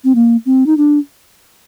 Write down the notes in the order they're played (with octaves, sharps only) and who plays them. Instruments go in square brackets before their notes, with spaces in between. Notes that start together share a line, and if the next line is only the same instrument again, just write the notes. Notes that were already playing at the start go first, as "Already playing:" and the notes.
[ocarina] C4
A#3
C4
D#4
D4